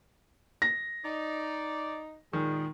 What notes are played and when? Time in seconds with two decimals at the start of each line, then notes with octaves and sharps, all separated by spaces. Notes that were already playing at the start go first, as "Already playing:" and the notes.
0.62 A#6
1.04 D#4 D5
2.33 A#2 D#3 G#3